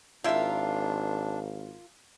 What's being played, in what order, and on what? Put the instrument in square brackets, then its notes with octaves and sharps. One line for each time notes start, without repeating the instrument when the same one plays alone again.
[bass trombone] G#1 [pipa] C3 E4 E5 [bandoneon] D4 [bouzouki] F4 A#4